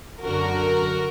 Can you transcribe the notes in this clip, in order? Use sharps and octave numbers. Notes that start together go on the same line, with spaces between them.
F#2 D3 F#4 A#4